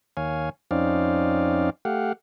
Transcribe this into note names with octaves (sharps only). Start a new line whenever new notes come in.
D#2 C#5 F5 G#5
F2 C4 C#4 D#4 D5 F5
A3 G4 F5 F#5